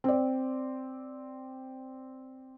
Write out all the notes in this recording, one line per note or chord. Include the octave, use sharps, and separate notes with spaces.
C4 D5